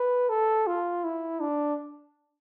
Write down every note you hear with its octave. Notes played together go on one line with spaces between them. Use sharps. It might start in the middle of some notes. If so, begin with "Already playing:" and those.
Already playing: B4
A4
F4
E4
D4